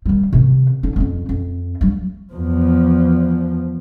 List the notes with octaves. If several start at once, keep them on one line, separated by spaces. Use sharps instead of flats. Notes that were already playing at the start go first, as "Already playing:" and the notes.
D#3 G3
C3 D#3
D3 D#4
D#1 F2
F2
G2 F#3
E2 F3